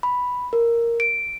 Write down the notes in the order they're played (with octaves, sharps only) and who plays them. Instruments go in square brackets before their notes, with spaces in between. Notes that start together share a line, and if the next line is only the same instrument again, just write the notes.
[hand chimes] B5
A#4
D7